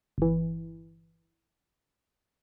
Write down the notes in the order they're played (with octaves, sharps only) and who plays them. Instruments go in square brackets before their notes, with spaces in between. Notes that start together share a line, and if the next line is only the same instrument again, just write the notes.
[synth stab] G1 E3